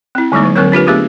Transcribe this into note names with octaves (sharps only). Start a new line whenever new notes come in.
C4 E4
D3 G3 G#3 A#3 D#4
F#3
D3 F#3 C4 A#4 C#5
D4 F4 G4 B4
A3 B3 D4 G4 G#4